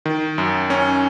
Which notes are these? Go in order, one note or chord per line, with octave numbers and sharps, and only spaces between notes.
D#3
F#2
C#4